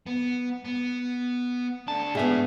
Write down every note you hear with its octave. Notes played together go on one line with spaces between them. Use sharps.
B3
B3
A3 D4 A5
G#2 B3 G#4 E5